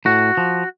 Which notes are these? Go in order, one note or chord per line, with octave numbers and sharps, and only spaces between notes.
A2 F#4
F3